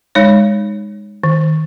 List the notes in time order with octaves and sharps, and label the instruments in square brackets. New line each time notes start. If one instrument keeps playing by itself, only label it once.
[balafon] G#3 D#4 C#5
D#3